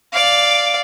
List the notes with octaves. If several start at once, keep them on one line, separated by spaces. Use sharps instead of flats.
D5 F5